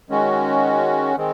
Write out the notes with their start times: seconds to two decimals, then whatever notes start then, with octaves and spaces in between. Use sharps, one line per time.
0.10 D#3 G#3 C#4 F#4
1.17 D#3 G#3 C4